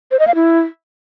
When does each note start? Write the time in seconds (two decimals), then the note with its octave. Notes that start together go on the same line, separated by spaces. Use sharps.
0.11 C5
0.19 D#5
0.27 F5
0.35 E4